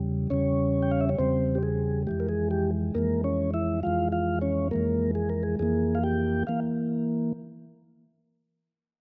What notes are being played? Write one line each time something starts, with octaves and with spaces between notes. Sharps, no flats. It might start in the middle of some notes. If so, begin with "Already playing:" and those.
Already playing: E2 C#3 G3
E2 C#3 G3 C#4 C#5
G5
F5
E5
C#5
E2 C#3 G3 C4 C5
G4
G#4
F2 E3 G#3 G4
A#4
G#4
G4
F2 E3 G#3 A#3 A#4
C#4 C#5
E4 E5
F2 E3 G#3 F4 F5
F4 F5
C#4 C#5
F2 E3 G#3 A#3 A#4
G#4
A#4
G#4
F2 E3 A#3 G#4
F5
G4 G5
E3 A#3 F5